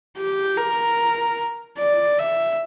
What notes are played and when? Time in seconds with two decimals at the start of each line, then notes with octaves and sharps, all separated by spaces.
0.17 G4
0.57 A#4
1.78 D5
2.19 E5